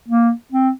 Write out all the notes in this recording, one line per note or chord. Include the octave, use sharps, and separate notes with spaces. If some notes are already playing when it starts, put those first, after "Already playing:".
A#3
C4